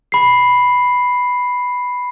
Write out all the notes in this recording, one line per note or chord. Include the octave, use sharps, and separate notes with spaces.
B5 C7